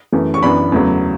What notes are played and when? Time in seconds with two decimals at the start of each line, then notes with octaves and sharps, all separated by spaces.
0.12 F#2 E3 A3
0.34 C#6
0.43 F#2 E3 B3 D4 B5
0.72 E2 C#3 F#3 A3